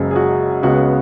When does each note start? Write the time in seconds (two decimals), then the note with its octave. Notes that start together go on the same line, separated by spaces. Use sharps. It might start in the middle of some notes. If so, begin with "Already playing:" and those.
Already playing: F#1 F#2 C#3 G#3
0.11 G#4
0.16 F#4
0.63 C#2 C#3 G#3 B3 F#4